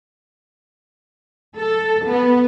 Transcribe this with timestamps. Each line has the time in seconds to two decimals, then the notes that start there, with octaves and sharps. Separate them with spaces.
1.55 A4
2.06 B3